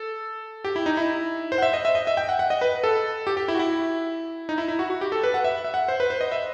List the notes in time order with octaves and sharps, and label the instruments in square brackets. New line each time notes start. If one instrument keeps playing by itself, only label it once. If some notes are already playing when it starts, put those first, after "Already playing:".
Already playing: [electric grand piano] A4
G4
E4
D#4
E4
C5
F#5
E5
D#5
E5
D#5
E5
G5
F#5
F#5
D#5
B4
A4
G4
G4
E4
F#4
E4
D#4
E4
E4
F#4
F#4
G4
A4
B4
F#5
E5
E5
F#5
C5
B4
C5
D#5
E5